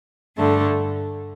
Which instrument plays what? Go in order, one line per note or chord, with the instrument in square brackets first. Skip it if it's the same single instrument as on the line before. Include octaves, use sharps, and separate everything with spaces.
[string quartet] G2 D3 A3